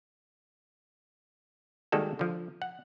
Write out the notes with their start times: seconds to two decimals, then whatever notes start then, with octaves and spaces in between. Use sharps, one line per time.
1.92 D#3 G3 G#3 A#3 F#4 A4
2.19 D3 F3
2.62 F#5